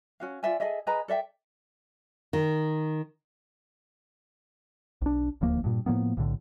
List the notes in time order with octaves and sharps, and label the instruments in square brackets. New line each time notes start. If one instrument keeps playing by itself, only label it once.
[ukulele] C#4 F#4 F5
F4 D5 E5 G#5
G#4 A4 D#5 E5
G#4 B4 D#5 A#5
A4 D5 E5 G5
[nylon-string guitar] D#3
[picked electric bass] B1 D4
D#1 D2 F3 A#3
G2 A#2
A2 F3 A#3 B3
B1 A2 D3